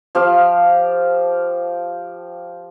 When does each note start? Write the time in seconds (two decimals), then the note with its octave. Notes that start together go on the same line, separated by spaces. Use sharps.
0.15 F3 G4 F5